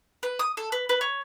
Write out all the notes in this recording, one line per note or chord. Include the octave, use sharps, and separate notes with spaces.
B4
D#6
A4
B4
B4
C#5